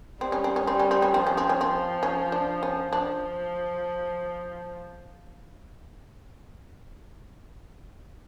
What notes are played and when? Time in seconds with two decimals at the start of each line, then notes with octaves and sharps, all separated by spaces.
0.20 G3 C4
0.32 C#4
0.44 C4
0.56 C#4
0.66 G3 C4
0.80 C#4
0.91 C4
1.02 C#4
1.12 F3 C4
1.27 C#4
1.37 C4
1.49 C#4
1.61 C4
2.03 C#4
2.32 D4
2.63 C#4
2.93 F3 D4